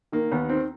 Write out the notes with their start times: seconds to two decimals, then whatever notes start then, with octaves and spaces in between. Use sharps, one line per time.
0.12 D#3 A#3
0.32 D#2 B3
0.49 D#3 C4